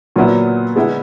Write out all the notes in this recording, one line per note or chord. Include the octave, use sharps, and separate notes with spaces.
A#2 F#3 B3 E4
G#3 B3 E4